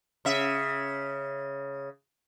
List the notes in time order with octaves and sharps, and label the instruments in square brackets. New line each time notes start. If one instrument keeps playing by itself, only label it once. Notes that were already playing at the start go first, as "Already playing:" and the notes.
[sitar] C#3 E5